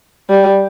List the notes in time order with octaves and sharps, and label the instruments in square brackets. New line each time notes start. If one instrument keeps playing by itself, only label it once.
[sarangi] G3